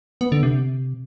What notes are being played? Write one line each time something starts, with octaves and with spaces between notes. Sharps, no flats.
B3
D3
C3